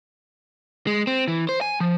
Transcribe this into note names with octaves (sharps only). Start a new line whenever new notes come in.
G#3
C4
E3
C5
G#5
F3